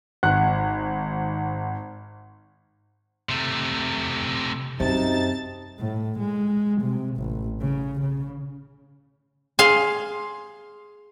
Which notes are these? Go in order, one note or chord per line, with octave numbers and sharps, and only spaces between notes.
G#1 F#5 F#6
C3 A3
F#2 C3 C4 D#4 A5 A6
A2
G#3
C3
A1
C#3
C#3
G#4 F5 C6